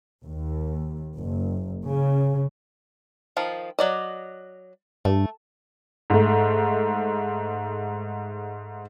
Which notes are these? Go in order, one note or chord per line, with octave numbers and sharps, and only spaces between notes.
D#2
F#1
C#3
D#3 F3 F4
F#3 D5 D#5
G2 A3
G#2 A3